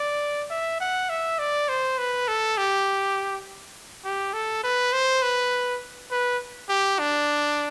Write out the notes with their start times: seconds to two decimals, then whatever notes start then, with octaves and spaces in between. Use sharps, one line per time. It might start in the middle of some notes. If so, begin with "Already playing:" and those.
Already playing: D5
0.50 E5
0.80 F#5
1.10 E5
1.39 D5
1.69 C5
1.98 B4
2.28 A4
2.57 G4
4.05 G4
4.33 A4
4.64 B4
4.93 C5
5.23 B4
6.11 B4
6.69 G4
6.99 D4